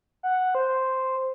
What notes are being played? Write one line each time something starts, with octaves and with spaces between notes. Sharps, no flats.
F#5
C5